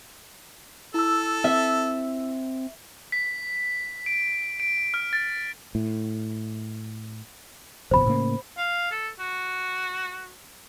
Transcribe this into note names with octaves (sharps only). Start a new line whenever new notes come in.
E4 A4 E6
C4 E5
B6
D7
D7
F6
A6
A2
D1 F2 B2 C5 B5
A2 C#3 A#3
F5
A4
F#4